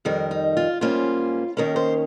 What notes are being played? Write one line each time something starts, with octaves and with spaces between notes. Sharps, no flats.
F2 D#3 G3 A#4
D#4
F4
G#2 G3 A#3 C#4 F4
D#2 D#3 A#3 C#4 A#4
C5